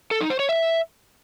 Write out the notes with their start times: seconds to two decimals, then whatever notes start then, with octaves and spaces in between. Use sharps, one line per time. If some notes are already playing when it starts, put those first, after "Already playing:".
0.11 A4
0.21 D#4
0.30 C5
0.39 C#5
0.49 E5